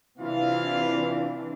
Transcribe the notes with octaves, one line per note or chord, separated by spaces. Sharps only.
C3 E3 D4 E4 F4 F5